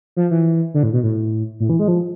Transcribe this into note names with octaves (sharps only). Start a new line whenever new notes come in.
F3
E3
D3
A2
B2
A2
A2
E3
G#3
F3